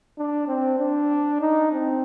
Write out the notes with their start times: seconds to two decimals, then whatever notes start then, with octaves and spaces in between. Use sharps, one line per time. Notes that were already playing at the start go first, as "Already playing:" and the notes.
0.18 D4
0.48 C4
0.79 D4
1.41 D#4
1.72 C4